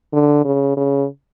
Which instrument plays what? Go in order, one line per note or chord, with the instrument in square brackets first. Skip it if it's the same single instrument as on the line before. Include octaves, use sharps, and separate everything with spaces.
[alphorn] D3
C#3
C#3